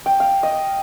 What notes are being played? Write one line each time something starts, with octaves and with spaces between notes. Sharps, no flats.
G5
F5
D#5